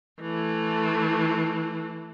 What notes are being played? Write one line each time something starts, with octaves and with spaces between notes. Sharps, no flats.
E3 A3